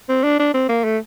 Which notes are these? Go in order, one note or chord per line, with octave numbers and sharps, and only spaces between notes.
C4
D4
D4
C4
A#3
A3